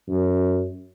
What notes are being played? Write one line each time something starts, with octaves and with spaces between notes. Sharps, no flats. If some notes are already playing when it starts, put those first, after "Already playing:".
F#2